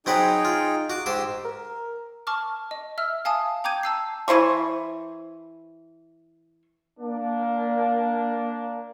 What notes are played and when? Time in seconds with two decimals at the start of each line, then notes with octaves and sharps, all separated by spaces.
0.06 F#3 C4 D#4 G#4 B4 G5
0.45 F4
0.90 F#4 D6
1.06 G#2 G4 C6 D6 E6
1.45 A#4
2.27 A5 C#6 D6 F6
2.71 D#5
2.98 E5 E6 F6
3.25 F5 G#5 A5 D#6
3.64 G5 A#5 D6 G6 G#6 D#7
3.83 A5 E6 C7
4.28 E3 E4 C5 C#6
6.99 A#3 D4